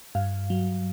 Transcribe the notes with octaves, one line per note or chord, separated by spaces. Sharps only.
G2 F5
F#3